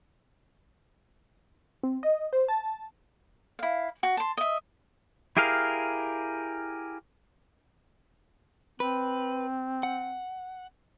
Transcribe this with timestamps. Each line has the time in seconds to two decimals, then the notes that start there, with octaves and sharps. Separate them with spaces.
1.83 C4
2.03 D#5
2.33 C5
2.48 A5
3.59 E4 F5
4.03 F#4
4.17 A5 C6
4.37 D#5 E5
5.37 E4 G4 G#4 A#4 F5
8.80 C4 B4
9.83 F#5